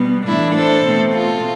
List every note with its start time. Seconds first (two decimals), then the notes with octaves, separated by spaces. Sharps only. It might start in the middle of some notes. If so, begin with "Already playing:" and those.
Already playing: B2 G3 B3
0.27 A2 E3 A3 D4 E4
0.55 A4 C5
0.84 B2 A3 C4
1.13 F4 A4